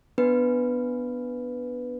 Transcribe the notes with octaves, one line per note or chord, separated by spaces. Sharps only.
B3 D4 B4